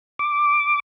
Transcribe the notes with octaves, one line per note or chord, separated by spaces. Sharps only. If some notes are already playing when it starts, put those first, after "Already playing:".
D6